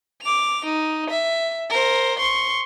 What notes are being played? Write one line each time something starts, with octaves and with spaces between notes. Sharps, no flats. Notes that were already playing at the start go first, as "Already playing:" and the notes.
D6 F7
D#4
E5
A#4 C5
C6 C#6